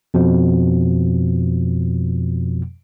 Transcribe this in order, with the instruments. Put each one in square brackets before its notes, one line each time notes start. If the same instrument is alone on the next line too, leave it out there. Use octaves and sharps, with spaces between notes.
[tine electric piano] F2 B2 F3